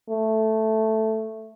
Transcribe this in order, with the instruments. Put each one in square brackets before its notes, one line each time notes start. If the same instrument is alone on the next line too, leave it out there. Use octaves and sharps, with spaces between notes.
[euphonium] A3